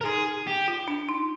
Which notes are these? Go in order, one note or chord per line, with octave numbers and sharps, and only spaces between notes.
A#4
D#4 G#4
G4
F4
D4
D#4